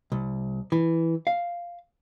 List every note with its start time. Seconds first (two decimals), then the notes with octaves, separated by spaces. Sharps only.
0.12 C2
0.72 E3
1.27 F5